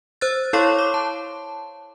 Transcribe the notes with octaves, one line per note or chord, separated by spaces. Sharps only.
C5 E6 F#6 A6
E4 A4 C#5 F5 C6 C#6
D6
A5